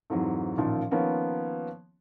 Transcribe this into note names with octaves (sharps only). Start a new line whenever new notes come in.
F2 G#2 E3 F#3
A1 A#2 D#3 F3
D#3 F3 A#3 B3 C#4